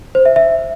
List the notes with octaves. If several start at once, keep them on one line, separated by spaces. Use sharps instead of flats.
C5
E5
E5